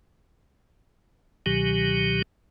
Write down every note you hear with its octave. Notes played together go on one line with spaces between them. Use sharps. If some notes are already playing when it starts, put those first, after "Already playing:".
C#2 B2 D#3 F#3 G4